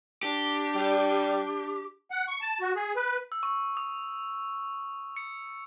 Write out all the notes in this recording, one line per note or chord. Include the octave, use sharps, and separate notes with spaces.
D4 G4
G3
F#5
C#6
A5
F#4
G#4
B4
E6
C#6
D#6
C#7